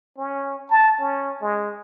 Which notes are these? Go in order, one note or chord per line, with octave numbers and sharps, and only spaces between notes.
C#4
A5
C#4
G#3